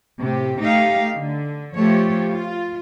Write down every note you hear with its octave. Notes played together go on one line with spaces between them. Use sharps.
A2 C3 G4
A3 D#4 G4 F5
D3
F3 A3 G4 C#5
F4